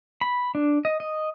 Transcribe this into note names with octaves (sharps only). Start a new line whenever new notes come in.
B5
D4
D#5
D#5